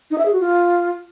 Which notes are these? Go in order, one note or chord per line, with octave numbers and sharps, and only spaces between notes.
D#4
E5
G#4
F#4
F4